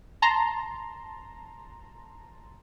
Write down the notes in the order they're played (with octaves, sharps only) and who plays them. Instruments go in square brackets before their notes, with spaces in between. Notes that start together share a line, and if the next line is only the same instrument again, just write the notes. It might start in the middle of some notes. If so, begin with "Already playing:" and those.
[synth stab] A5 A#5 C6